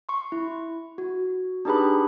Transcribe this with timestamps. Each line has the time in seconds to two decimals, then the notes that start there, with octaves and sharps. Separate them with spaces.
0.09 C6 C#6
0.32 E4
0.98 F#4
1.65 D4 D#4 G4 G#4 B4 B5